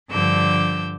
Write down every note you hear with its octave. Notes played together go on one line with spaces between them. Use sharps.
G2 D3 F3 D6 E6 G6